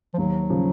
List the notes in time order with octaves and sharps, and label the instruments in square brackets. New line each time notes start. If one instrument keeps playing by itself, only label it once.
[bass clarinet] F3
[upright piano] D#2 [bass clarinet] F#3
[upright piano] C#3 F3